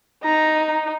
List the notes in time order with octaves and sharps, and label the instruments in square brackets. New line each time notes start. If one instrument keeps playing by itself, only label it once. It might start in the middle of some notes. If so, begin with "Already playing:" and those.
[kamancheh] D#4 [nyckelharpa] A#5